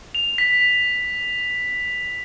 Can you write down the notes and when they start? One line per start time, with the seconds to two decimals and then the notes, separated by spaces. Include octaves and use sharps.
0.15 F7
0.38 B6